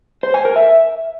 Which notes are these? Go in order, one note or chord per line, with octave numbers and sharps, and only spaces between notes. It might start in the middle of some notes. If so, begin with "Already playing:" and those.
C5
G#5
A#4
E5